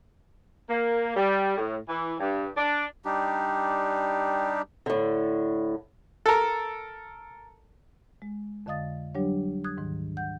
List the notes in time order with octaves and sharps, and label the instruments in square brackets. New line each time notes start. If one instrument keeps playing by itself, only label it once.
[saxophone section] A#3
G3
A2
E3
G2
D4
[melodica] G3 D4 D#4 G4
[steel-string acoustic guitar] A2 D3
[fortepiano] A4 A#4
[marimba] G#3
F2 D3 D#5 F5 D#6 A6
F#3 G3 D4 G4 C#5
D#6 F#6 G#6
D2 G#2 D#3
F#5 G6